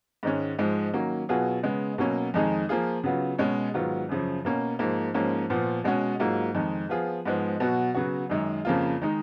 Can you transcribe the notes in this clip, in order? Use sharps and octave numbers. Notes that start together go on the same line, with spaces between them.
G#2 D#3 G#3 C#4
G#2 F3 G#3
D#3 F#3 A#3 C#4
B2 F#3 B3 F4 G#4
C#3 G#3 B3
B2 F#3 A#3 C#4
F2 D#3 G#3 D#4 G#4
F3 A#3 F4 G#4
C#3 F#3 B3 F4
B2 G#3 C#4
G#2 D#3 F#3 B3 F4
F#2 C#3 F3
B2 A#3 C#4
G#2 F3 A#3
G#2 F3 A#3 C#4
A#2 F3 B3
B2 G#3 C#4 F#4
G#2 F#3 A#3 F4
F2 D#3 G#3
F3 B3 F4 G#4
G#2 F3 G#3 B3
B2 F#3 B3 F#4
C#3 F#3 B3 F#4
F#2 D#3 G#3
F2 C#3 F3 A#3 F4
D#3 G#3 D#4